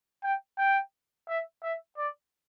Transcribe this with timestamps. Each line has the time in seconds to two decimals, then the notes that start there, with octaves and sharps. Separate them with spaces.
0.23 G5
0.58 G5
1.28 E5
1.63 E5
1.97 D5